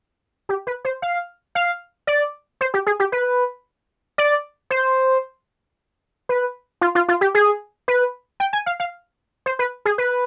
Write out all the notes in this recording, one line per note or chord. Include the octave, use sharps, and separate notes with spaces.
G4
B4
C5
F5
F5
D5
C5
G4
G#4
G4
B4
D5
C5
B4
F4
F4
F4
G4
G#4
B4
G5
G#5
F5
F5
C5
B4
G#4
B4